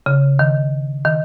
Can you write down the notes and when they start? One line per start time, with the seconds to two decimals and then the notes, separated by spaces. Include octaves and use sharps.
0.06 C#3
0.39 D#3
1.05 D#3